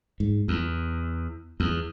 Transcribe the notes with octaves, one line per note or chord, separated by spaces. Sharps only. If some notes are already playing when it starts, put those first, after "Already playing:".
G#2
E2
E2